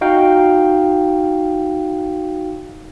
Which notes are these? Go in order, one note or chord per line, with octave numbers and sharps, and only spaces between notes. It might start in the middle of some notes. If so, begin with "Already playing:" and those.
D#4 F#4 F5 G5